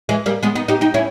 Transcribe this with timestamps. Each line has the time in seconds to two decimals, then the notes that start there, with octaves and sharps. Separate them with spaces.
0.09 E3 G#3
0.26 G3 A#3
0.43 G#3 B3
0.55 B3 D#4
0.68 D#4 G4
0.81 D#4 G4
0.94 C#4 E4